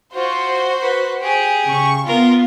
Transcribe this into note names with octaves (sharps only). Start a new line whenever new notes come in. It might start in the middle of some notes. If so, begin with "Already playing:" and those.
F4 F#4 C5
B4
G4 G#4
C#3 C#6
B3 F4 A#4